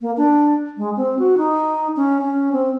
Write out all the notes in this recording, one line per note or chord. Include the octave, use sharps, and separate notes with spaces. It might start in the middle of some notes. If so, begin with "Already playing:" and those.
A#3
D4
G#3
C4
F#4
D#4
C#4
C#4
C4